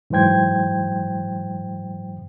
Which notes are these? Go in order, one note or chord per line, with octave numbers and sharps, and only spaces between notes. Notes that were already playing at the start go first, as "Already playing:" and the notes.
G#2 E3 F#3 C5 G5 G#6